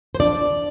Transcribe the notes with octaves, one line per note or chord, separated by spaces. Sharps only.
C5
F3 D4 D5